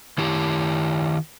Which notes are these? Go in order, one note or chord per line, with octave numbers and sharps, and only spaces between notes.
D#3 E4 G4